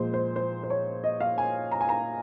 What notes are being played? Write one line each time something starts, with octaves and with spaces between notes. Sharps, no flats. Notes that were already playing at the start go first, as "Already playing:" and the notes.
Already playing: A#2 F3 G#3 C5
C5
C5
C5
C#5
D#5
F5
G#5
A#5
G#5
A#5